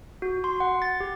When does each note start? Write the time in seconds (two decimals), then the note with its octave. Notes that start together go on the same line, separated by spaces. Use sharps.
0.22 F#4
0.44 C6
0.60 F#5
0.82 A6
1.00 G4